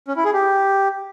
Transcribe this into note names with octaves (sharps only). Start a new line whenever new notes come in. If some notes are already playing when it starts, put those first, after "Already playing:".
C#4
E4
G#4
G4